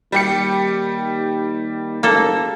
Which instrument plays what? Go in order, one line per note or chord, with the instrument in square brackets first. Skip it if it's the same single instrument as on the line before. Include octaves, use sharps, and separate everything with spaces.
[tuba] D#2 [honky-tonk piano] G3 G4 C#7
[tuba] F#1 [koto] A#3 A4